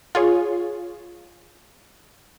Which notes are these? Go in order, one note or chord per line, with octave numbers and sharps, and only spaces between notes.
F4 G#4 C#5